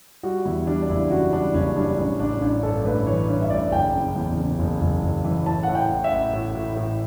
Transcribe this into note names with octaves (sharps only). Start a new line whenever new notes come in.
G3 F#4
E2 E4
G3 D4
D4
F#1 E4
C#3 F#4
G3 D4
F#1 C#4
G3 D4
A1 C#4
A1 D4
A1 D4
G2 A4
A1 B4
E3 C#5
G2
E5
A1 D5
F#1 G5
C#3
E2
C#3
F#1
F#1
F#1
E3
A2 A5
A2 F#5
G5
A1
E5
A1
A2
A2
A2